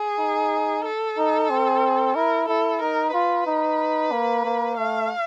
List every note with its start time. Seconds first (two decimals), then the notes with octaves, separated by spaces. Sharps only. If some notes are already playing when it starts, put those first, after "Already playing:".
Already playing: G#4
0.19 D#4
0.85 A4
1.18 D#4
1.50 C4
2.15 E4 A#4
2.48 E4 A4
2.81 D#4 A#4
3.14 F4 B4
3.46 D#4
4.12 A#3
4.45 A#3
4.78 A3 F5